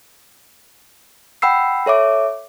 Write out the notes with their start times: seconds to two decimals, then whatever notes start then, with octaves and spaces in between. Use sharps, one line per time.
1.42 F#5 G5 B5 E6 C7
1.86 A4 C#5 E5 D6